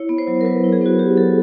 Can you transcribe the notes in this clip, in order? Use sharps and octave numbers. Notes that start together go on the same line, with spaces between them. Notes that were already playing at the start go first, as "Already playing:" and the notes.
Already playing: E4 C#5
B3
C5
F#3
A#4
F#3 B4
E4
G#4
B3 F#4
F#3 G4
F#3 A4